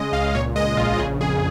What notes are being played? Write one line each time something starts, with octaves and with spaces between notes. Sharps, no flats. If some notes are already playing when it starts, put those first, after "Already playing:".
Already playing: C#3 G#3 D#5
C#2 F5
A#2 C#5
G#3 D#5
A#1 F4
C#3 G#4
F2 G#4